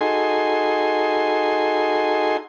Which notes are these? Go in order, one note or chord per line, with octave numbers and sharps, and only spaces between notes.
D#4 F#4 G#4 A4 G#5 C6